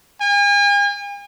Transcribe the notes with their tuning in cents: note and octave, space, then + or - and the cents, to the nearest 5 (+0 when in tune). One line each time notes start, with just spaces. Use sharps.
G#5 -45